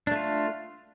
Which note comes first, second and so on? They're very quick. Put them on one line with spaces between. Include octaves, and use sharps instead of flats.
D4 A3 F4